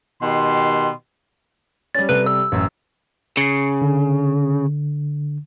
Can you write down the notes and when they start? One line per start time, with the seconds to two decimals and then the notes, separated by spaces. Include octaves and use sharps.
0.22 B2 D#3 G4 C6
1.95 G3 C#4 A6
2.09 C3 G3 A4 B4
2.27 E6
2.52 A1 F#2
3.37 C#3 C7 C#7
3.82 D3